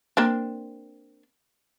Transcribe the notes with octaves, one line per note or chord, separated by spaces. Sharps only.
A#3 C4 D4